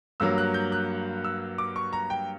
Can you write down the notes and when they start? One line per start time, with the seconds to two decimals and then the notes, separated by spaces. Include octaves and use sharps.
0.20 G2 F#3 A#3 E6
0.38 F#6
0.54 G6
0.72 F#6
1.24 E6
1.58 D6
1.76 C#6
1.93 A#5
2.10 G5